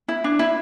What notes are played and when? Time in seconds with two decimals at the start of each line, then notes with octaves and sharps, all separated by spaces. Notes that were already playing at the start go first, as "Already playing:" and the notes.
0.08 E4
0.24 D4
0.39 E4